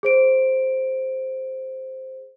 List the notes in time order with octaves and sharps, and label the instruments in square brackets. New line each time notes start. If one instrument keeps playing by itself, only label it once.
[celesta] G#4 C5 D7